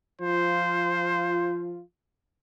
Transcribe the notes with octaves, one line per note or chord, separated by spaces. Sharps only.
F3 F4 C5